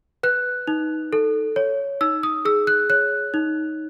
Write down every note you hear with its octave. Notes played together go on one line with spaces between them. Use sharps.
B4 F#6
D#4
A4
C#5
D#4 E6
D#6
G#4 E6
F#6
C#5 F#6
D#4